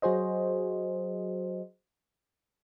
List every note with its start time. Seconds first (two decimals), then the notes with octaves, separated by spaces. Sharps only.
0.02 F#3 F#4 G#4 C5 D#5